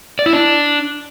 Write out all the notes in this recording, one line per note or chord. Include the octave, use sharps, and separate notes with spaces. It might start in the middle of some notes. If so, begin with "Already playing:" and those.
D5
E4
D4